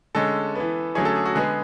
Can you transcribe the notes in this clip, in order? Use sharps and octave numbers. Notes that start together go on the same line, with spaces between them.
D3 G#3 C#4 A4
E3 B3
D3 F#3 A3 C#4 G#4
A4
G#4
F#4
D3 G#3 B3 G#4